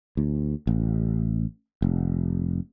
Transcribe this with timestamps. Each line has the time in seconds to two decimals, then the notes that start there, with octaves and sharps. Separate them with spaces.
0.17 D2
0.67 A1
1.82 F1